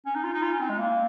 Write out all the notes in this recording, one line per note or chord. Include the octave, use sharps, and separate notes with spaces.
C#4
D#4
F4
D#4
F4
C#4
C4
G#3
A#3